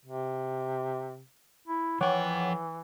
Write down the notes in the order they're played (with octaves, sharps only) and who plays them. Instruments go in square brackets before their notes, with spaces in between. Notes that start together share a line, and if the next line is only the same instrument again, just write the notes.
[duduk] C3
E4
[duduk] E3 [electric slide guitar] F3 G5 [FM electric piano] C#5 F#5 D6